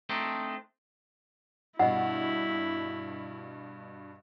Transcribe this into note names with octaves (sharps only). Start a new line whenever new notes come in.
A3 C4 D4 D#4
G2 B2 E4 D#5 F#5